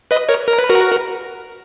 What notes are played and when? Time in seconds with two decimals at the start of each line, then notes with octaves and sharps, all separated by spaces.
0.11 B4 D#5
0.29 A#4 C#5
0.48 A#4
0.59 B4
0.69 F#4 A#4